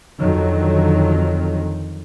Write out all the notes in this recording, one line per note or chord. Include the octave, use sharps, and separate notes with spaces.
F2 D3 D#3 F#3